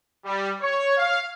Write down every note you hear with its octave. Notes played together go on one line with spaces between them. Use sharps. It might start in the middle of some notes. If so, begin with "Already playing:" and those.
G3
C#5
F5